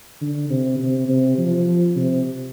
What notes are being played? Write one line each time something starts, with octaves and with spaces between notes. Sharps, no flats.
D3
C3
C3
C3
F3
C3